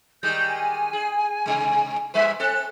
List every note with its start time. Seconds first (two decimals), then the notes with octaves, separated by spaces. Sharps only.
0.23 D#3 G3 G#3 G6
0.49 G#5
0.93 G#4
1.46 C3 G#3
2.14 G#2 G3 B4 E5
2.40 C4 A4 F#6